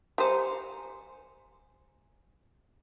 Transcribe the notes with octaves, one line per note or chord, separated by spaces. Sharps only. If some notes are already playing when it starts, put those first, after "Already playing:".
G3 C5 G#5 A#5 C6